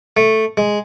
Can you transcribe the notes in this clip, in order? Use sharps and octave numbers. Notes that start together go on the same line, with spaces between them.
A3
G#3